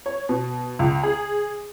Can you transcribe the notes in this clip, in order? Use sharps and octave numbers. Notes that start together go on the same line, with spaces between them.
C#5
B2
C#2
G#4